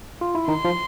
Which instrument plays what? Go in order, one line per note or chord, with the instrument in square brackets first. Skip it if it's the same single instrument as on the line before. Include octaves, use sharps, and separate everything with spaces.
[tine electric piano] F4
E4
[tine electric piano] D#3 D#4 [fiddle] C6
[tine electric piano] F3 F4